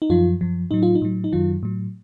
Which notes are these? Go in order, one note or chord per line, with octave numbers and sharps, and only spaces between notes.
D#4
F#2 F3 F4
F#2 F3
A2 F#3 D#4
F4
D#4
A2 F#3
D#4
F#2 D#3 F#3 F4
A2 F#3